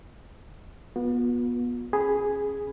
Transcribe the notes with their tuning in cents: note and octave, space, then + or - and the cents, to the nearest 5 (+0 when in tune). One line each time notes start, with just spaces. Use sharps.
B3 -25 F4 +45
C#4 -25 G#4 +0 B5 +0